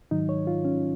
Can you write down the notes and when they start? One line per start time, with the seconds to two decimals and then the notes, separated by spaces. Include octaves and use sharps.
0.11 G#2 D#3 F#3 D#4
0.29 C#5
0.47 F4
0.64 C#4